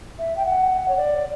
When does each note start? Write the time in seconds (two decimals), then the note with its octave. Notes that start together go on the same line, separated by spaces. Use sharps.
0.19 E5
0.36 G5
0.45 F#5
0.88 C#5
0.97 D5